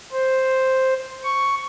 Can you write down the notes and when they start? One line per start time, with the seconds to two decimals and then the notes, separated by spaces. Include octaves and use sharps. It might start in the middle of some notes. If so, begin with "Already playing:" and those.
0.12 C5
1.24 C#6